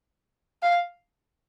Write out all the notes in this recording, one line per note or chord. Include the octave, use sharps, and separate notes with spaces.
F5